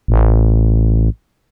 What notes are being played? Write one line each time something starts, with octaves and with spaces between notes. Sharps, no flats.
A1